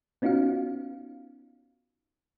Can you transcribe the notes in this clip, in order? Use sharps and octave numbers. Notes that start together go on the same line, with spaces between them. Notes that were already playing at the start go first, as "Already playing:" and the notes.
B3 C#4 D#4 F4 F#4 F5